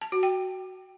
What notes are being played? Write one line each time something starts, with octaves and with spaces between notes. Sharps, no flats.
A5
F#4
G5